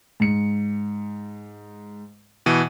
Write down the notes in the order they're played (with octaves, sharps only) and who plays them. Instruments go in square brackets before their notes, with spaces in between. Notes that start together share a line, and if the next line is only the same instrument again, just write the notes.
[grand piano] G#2 C#7
[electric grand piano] B2 E3 D#7